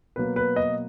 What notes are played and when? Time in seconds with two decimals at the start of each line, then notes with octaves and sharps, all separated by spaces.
0.16 B2 F#3 A#3 B4
0.36 B4
0.56 D#5